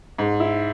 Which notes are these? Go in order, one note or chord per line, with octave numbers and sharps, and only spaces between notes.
G#2
E4